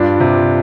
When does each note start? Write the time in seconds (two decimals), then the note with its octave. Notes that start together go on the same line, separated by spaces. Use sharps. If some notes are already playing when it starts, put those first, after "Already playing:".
Already playing: G2 D4 F4
0.20 C3